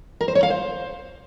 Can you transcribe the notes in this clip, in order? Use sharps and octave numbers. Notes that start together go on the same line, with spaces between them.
A#4
C5
C#5
F5
C5